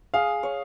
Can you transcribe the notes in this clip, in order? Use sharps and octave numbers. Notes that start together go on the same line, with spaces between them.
G#4 F5
C#5